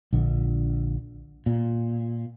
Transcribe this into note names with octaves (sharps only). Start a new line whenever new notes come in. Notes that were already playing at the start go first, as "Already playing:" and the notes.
A#1 D3
A#2